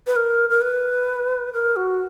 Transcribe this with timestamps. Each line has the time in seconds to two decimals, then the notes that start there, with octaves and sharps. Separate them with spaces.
0.07 B4
0.16 A#4
0.50 A#4
0.61 B4
1.53 A#4
1.76 F#4